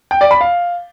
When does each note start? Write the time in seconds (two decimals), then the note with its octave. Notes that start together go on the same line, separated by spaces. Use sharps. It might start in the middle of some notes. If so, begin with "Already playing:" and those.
0.11 G5
0.21 D5
0.31 B5
0.41 F5